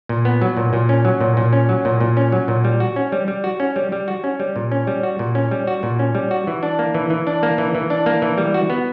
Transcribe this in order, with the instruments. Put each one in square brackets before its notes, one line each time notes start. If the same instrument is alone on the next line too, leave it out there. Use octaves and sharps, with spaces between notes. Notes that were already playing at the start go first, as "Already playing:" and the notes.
[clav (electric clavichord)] A#2
B3
F#3
A#2
A#2
C#4
F#3
A#2
A#2
C#4
F#3
A#2
A#2
C#4
F#3
A#2
G3
F#4
C#4
G3
G3
F#4
C#4
G3
G3
F#4
C#4
G3
A#2
C#4
G3
F#4
A#2
C#4
G3
F#4
A#2
C#4
G3
F#4
E3
D4
A#3
E3
E3
D4
A#3
E3
E3
D4
A#3
E3
G3
F#4
B3